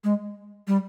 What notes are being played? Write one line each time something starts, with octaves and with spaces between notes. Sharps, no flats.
G#3
G3